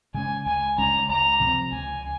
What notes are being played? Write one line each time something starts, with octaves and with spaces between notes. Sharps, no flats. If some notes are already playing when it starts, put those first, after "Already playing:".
C#3 G#3 C#4 G#5
C#2 G#5
C#3 G#3 C#4 A#5
C#2 A#5
C3 F3 C4
C#2 G#5